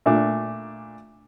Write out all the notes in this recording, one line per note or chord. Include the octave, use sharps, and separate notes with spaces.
A#2 A3 D4